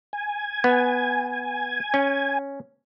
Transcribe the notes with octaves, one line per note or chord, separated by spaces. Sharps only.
G#5
B3
C#4